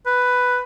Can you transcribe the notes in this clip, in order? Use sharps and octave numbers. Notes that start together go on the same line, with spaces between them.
B4